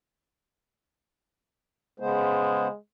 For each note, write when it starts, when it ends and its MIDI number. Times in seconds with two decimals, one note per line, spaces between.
2.00 2.68 49
2.00 2.77 56
2.00 2.68 59
2.00 2.68 72